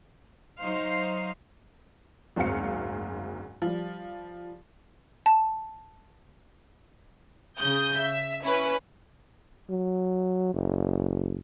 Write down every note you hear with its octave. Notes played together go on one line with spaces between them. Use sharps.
F#3 D#4 C5 F5
F#1 D2 G#2 C4 F5 C#7
F3 G3
A5
C#3 D#6 G6
E5
C#4 E4 B4
F#3
F#1